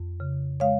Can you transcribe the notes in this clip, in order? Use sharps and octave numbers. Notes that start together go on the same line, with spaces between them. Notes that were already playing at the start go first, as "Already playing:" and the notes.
Already playing: F2
C#3
G#3 C#5 F5